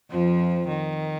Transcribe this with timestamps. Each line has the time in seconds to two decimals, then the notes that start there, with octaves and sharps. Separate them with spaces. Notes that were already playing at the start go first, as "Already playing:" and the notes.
0.11 F2 F3
0.68 D#3